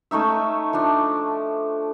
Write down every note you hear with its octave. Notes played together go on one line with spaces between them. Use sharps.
A3 C#4 D#4 E5
F3 D4